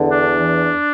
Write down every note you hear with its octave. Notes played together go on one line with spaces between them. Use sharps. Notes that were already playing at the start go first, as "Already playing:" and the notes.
Already playing: E2 D3
D4
E3